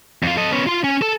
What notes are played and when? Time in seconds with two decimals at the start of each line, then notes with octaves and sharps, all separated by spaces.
0.23 F2 F4
0.37 A4 D#5
0.52 B3 C#4
0.67 F4 C6
0.84 C#4
1.02 A4